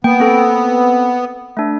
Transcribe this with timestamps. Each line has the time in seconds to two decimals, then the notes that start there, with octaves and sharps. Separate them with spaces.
0.04 A#3 B3 G5
0.20 C4 A4
1.57 A3 D4